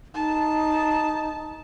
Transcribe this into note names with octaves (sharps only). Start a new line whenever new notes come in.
D#4 A5